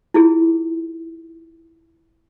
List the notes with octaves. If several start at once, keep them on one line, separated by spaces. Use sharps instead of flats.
E4 F4 G#4